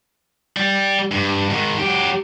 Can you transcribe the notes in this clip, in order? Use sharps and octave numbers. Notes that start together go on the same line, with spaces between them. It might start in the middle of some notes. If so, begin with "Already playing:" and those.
G3
G2
G#2 D#3
F#3 G4